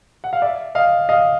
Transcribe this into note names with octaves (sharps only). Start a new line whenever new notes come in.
F#5
F5
D5 E5
D#5 F5
D#5 F5